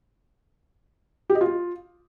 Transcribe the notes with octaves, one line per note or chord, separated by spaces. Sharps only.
G4
D#5
F4